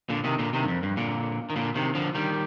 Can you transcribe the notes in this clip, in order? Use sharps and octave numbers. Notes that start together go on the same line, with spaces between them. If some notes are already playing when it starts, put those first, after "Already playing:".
A#2 D3
C3 D#3
A#2 D3
C3 D#3
G2
F2
G2
A#2 D3
D#3
A#2 D3
C3 D#3
D3 F3
D#3 G3